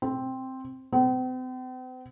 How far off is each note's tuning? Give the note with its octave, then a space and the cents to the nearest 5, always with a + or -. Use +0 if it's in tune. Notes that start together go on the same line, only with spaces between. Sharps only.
C4 +0
C4 -45